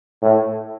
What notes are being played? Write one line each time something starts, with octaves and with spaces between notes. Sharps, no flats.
A2